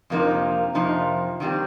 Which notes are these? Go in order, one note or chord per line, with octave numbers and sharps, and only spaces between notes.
F2 C3 F3 A#3 D#4
F2 C3 F3 A#3 D#4
D#3 G3 C4 G4